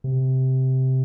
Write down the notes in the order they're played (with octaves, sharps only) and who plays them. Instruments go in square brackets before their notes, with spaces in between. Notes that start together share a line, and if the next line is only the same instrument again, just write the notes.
[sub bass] C3